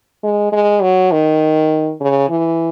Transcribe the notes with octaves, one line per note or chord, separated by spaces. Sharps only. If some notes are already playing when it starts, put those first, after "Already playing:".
G#3
G#3
F#3
D#3
C#3
E3